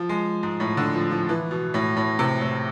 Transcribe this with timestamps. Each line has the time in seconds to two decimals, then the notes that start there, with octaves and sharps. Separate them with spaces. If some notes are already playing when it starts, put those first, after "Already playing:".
Already playing: F3
0.09 G#3
0.43 G#2
0.60 A2
0.77 D3
0.95 F3
1.11 F3
1.29 E3
1.51 B2
1.74 A2
1.96 A2
2.19 C3
2.41 A2